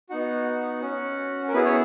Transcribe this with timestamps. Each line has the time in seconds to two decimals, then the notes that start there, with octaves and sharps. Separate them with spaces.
0.09 B3 D#4 F#4 F#5
0.46 F#5
0.82 C#4 F#4
1.48 A#4
1.53 B3 E4 G#4 B4
1.65 C#5